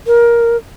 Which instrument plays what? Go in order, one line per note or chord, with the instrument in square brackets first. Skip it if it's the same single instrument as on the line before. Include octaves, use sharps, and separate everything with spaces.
[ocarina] A#4